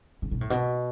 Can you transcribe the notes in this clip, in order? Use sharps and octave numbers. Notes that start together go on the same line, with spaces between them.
C#3
B2
A2
B2